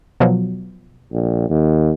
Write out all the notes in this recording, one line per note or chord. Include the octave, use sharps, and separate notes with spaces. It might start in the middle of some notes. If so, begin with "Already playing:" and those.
B2 F3 F#3
A#1
D#2